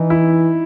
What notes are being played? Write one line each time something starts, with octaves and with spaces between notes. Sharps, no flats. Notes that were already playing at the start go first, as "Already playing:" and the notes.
Already playing: E3 D#4
E4